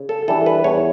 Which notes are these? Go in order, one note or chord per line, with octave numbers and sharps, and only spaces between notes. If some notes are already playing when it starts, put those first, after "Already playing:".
Already playing: C#3
A4
E3 G3 D4 A4
B4
E2 C#5